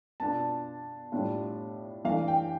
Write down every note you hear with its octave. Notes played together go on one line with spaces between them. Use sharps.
B2 B3 D4 F4 A5
A2 G3 D4 F4
E3 A3 D4 F5
G5